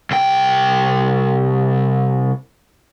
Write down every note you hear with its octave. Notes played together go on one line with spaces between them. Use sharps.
C2 G5